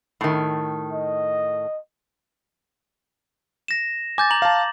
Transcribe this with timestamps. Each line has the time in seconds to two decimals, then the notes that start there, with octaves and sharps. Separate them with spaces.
0.21 A2 D#3
0.93 D#5
3.68 A#6 E7
4.18 G#5 D6 G6 A6
4.31 A#5 F#7
4.42 F5 A5